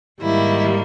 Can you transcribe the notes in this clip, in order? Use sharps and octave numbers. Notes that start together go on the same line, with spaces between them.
G#2 D#3 G3 A#3 E4